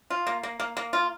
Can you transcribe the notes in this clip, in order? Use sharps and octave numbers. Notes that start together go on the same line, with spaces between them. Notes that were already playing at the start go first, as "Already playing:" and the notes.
F4
A#3
A#3
A#3
A#3
F4